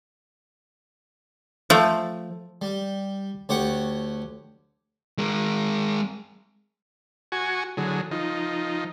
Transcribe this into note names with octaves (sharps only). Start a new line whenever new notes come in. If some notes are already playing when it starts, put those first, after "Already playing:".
F3 A3
G3
D2 G4 C#5 F#5
G#3 A#4
F#4 G#5 C#6
D3 F#3 G#4
F3 D#4